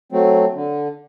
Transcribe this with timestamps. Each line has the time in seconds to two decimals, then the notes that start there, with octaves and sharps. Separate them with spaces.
0.12 F#3 A3 C4
0.54 D3